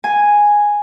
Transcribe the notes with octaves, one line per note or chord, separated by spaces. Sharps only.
G#5